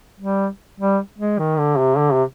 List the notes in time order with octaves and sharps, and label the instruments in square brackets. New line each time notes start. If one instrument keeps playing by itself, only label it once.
[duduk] G3
G3
G#3
D#3
D3
C3
D3
C3